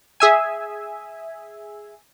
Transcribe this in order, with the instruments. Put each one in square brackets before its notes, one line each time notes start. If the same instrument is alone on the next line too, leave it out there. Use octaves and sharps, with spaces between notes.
[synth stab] G#4 E5 G#5